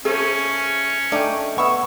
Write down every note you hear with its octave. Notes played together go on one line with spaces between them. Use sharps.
A3 A#3 C#4 G#4 C5 A5
A3 D4 D#4 D5 G5
B3 E5 C#6